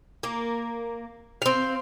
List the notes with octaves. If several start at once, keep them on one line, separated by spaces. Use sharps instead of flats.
A#3
C4 F5